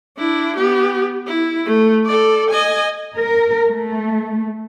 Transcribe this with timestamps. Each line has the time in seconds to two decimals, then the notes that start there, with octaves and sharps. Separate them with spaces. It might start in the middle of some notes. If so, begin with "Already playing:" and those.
0.18 D4 E4
0.57 B3 G4
1.27 E4
1.65 A3
2.06 A4 D5
2.50 D#5 G#5
3.16 A#4
3.67 A3